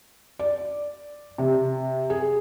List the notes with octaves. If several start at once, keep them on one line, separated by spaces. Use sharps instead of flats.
D5
C3
G#4